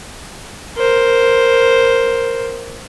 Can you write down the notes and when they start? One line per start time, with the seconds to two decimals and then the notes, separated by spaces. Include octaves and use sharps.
0.77 A#4 C5